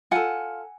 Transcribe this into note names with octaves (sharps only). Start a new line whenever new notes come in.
F4 A4 F#5 G#5